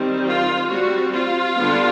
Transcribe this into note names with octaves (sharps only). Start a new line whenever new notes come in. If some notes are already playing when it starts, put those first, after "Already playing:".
Already playing: D#3 G3 C4
F4
G3 C4 F#4
F4
D3 G3 B3 D4